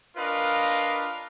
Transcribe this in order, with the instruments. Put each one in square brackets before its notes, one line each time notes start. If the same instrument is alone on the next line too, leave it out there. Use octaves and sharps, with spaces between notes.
[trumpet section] D4 F4 A#4 B4 D#5 F5